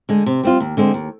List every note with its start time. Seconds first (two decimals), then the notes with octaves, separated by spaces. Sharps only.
0.09 D3 G#3
0.26 C3
0.43 G3 C4 F4
0.60 D#2
0.77 D3 G#3 C4
0.94 D#2